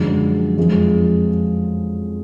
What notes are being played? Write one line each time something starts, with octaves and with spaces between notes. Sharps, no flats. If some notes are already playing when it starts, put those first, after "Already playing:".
Already playing: F#2 D3 F3 G#3
F2 F3 G#3